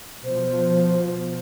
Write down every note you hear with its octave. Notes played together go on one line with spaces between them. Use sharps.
B2 F3 C5